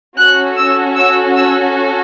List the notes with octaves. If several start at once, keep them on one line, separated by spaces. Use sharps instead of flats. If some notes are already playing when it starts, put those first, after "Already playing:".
C#4 F#4 A4 F#6
E6
E6
E6